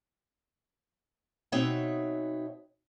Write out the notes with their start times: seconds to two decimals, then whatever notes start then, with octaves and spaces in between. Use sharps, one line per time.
1.52 B2 C4 D#4 C#5 E5 F#5